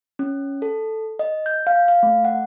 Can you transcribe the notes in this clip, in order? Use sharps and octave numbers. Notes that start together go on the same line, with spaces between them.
C#4
A4
D#5
G6
F5
F5
A3
F#5